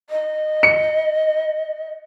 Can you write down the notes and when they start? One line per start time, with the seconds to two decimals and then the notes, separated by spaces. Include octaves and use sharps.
0.10 D#5
0.63 C#7